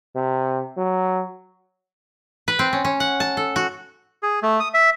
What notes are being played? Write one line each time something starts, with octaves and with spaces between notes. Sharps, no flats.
C3
F#3
B4
C4
C#4
C#4
F#5
A5
A4
F#4
G#4
A3
D#6
E5